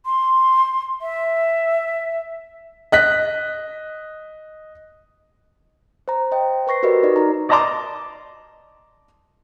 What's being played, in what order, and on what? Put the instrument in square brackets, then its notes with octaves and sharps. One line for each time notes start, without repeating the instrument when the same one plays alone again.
[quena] C6
E5
[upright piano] D#5 F#6 B6
[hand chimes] C5 A#5
C5 D#5 G5
B4 C5 C#6 A#6 C7
F#4 G4 A#4 B4 D5 D#5
D#4 D5 D#5
D#4 A#5
[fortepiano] D5 D#5 A5 A#5 C6 D6